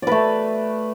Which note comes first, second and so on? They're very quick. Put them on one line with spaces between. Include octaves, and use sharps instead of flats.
D5 B4 A3